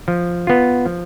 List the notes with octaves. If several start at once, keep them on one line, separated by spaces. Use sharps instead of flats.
F3
B3 F4
F3